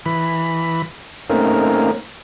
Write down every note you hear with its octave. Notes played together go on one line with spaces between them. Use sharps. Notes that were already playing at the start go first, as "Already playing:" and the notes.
E3 B5
A3 A#3 C4 C#4 D#4 A#4